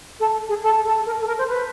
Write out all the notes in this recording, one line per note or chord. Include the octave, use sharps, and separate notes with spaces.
A4
G#4
A4
A4
A#4
A4
A#4
C5
B4